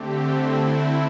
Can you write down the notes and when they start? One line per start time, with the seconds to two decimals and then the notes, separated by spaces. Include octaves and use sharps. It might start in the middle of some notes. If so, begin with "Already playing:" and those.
Already playing: D3 A3 C4 G4
0.37 E4